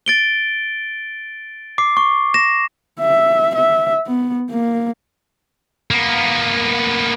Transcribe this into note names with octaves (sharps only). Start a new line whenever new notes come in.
A6 D7 G7
D6 C7
C#6
A#6 E7
E5
E5
B3
A#3
A#3 B3